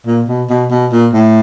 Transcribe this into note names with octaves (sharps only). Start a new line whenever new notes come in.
A#2
B2
B2
B2
A#2
A2